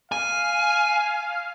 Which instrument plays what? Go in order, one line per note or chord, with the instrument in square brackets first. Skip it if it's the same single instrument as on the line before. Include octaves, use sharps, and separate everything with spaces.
[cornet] F5 [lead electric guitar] G#5